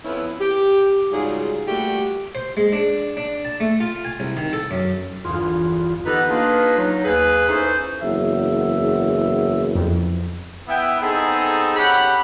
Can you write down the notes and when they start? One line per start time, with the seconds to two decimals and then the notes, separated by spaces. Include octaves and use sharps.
0.04 F2 B3 C#4 E4
0.41 G4
1.12 G#2 C#3 G3 F4 F#4 G#4
1.67 A#2 G3 A3 F#4 G4
2.35 C5
2.57 G#3
2.73 D4
3.17 D4
3.45 A5
3.60 A3
3.80 F4
4.05 G#5
4.20 C2
4.37 D#3
4.53 A4
4.71 F#2
5.25 G1 E2 F4
6.05 D3 B3 D#4 G4 A4 B4
6.28 A#3 D4 D#4 F4 G#4 B4
6.77 F#3 D#4
7.04 D#2 G#4 B4
7.47 C#4 D#4 E4 G#4 A4 C5
8.02 F#1 E2 E5
9.75 F2
10.68 B3 E4 E5 G5
11.01 B3 C4 D#4 G#4 A4
11.76 C#4 G4 F#5 B5